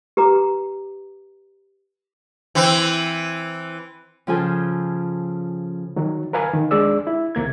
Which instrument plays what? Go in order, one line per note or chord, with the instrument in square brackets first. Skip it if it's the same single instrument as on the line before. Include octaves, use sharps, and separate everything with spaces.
[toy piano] G4 B4 A#5 D6
[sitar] E3 C4
[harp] C#3 F3 F4 A4 G#5 G6
[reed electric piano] D#3 F#3
A#4 B4 F5 G#5
D#3
G#3 D4 G#4 D5 E6
E4
C2 C3 A#3 G#6